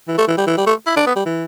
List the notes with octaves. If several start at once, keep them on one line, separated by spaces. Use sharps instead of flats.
E3
A3
E3
G3
E3
G3
A3
E4
D4
B3
G3
E3